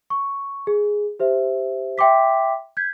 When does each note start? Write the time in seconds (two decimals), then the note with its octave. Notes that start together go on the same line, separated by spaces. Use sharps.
0.10 C#6
0.67 G#4
1.20 G4 C5 E5
1.98 E5 G5 C6 D6 B6
2.77 G6 G#6 B6